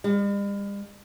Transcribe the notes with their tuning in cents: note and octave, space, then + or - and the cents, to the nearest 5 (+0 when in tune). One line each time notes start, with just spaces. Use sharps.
G3 +45